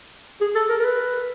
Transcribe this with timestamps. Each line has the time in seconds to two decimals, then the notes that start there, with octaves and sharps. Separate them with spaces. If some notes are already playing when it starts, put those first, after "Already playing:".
0.41 G#4
0.55 A4
0.69 A#4
0.80 A#4
0.84 B4